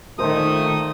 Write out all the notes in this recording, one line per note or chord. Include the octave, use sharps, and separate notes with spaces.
A#2 D#3 A3 A#4 C5 D#6